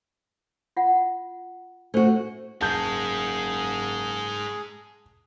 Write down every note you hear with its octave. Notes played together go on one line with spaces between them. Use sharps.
F4 F#5
A3 D4 F#4 C5
F#1 G#2 G#3 G#4 A5 G6